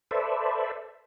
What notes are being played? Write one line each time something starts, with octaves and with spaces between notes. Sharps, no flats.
A4 B4 C5 D5 E5